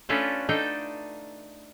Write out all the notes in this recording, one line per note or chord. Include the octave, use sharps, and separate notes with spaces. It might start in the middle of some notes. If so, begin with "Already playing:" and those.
A3 C#4 D4 F4 A4 B4
D4 D#4 A4 G5